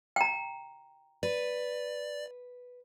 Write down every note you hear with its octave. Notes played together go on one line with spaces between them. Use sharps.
G5 A#5
B4 D5